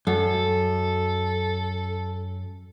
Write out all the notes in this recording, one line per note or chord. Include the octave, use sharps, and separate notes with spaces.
F#2 A4